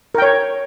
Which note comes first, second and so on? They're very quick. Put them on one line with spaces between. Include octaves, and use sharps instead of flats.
A#4 G5 C#5